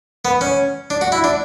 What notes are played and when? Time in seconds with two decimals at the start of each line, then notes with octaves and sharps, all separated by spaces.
0.25 B3
0.41 C#4
0.90 D4
1.01 F#4
1.12 E4
1.24 D4